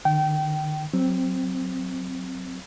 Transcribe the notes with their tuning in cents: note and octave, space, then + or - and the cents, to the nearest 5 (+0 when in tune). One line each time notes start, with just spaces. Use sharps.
D#3 -40 G5 -25
F#3 +0 C4 +0